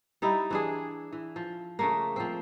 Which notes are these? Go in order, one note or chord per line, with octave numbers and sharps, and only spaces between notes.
G3 D#4 E4
E3 D4 G#4
E3
F3
C#3 A3 A#3
F3 C4